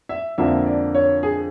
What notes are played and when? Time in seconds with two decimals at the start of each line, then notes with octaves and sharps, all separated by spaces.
0.09 E5
0.38 F2 D3 F3 A#3 D4 E5
0.66 D5
0.95 C#5
1.23 G#4